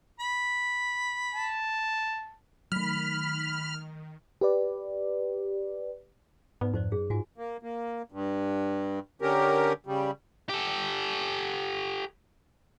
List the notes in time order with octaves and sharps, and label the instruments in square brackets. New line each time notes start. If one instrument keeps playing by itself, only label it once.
[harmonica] B5
[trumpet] A5
[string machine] D#3 [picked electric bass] F#3 A3 [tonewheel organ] B5 [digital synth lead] F6
[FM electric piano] G4 B4 D5
[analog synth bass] G#2 [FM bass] B3 [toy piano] D#4 B4 D5
[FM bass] F2 [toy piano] D#4 C5 D5
[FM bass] F#2 [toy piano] G#4
[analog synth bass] G#2 [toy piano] F4 F#4 G#5
[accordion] A#3
A#3
G2
D3 C#4 G4 A#4
C#3 G3
[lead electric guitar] G4 A4